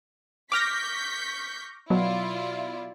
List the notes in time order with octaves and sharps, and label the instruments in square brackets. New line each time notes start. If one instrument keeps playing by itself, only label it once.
[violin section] C#6 G6 B6 [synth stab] D6 F6 A#6
[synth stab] B2 F#3 [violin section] E4 F4 D5